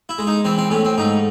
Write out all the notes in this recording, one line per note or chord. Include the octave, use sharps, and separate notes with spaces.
E4
G#3
D#4
E3 C4
C4
A2 C#4
C4
G#2 D#4